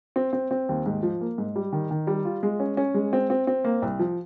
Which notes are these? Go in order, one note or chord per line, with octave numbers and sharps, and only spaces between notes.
C4
C4
C4
D#2
G#2
F3
A#3
G#2
G3
D#3
D#3
G3
F4
G#3
C#4
C#4
G#3
C4
C4
C4
A#3
C2
F3